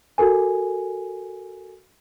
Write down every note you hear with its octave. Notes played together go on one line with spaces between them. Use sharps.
F#4 A4 A#4 G#5